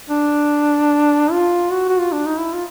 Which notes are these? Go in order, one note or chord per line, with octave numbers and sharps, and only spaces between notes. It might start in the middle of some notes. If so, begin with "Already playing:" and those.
D4
F4
F#4
F#4
F4
D4
D#4
E4
F4